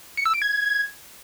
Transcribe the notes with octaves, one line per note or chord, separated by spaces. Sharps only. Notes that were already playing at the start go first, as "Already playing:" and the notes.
C#7
E6
D7
G#6